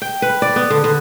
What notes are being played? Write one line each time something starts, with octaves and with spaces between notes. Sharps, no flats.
G5
B4
D5
B3
D3
D3